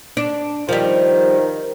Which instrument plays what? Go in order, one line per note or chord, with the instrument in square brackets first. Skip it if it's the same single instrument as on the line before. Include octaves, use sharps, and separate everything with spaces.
[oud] D4
[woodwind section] D#3 [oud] F3 G3